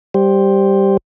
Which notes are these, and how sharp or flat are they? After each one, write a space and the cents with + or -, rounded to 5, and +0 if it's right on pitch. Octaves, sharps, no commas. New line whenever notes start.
G3 +0 G4 +0 C5 +5